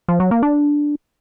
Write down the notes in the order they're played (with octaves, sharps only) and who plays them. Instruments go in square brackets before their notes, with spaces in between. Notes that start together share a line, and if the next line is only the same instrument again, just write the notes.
[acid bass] F3
F#3
A#3
D4